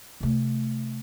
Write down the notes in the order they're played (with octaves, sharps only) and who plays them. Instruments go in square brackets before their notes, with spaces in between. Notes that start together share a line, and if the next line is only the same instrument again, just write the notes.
[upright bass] C3 A3